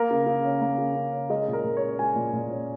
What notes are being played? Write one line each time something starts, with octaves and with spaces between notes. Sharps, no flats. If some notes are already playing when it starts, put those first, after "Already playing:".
Already playing: A#3 A#4
C#3
C#3
C#4
A#3
C#3
C#3
C#4
G#3 D#5
A#2
A#4
A#2
C#5
C#4
G#3 G#5
A#2
A#2
C#4